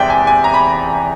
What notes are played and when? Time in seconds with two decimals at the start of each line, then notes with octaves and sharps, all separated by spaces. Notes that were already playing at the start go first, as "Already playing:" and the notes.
Already playing: E2 C3 E3 G#3 D5 E5 G5
0.10 G#5
0.27 G#5
0.44 A#5
0.54 B5